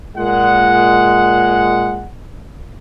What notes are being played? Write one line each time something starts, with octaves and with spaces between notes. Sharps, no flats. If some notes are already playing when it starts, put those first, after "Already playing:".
A#2 G#3 F#5